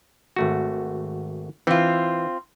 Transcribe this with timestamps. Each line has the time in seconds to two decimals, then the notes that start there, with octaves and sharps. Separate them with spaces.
0.36 G#1 A3 F#4
1.67 E3 C4 F4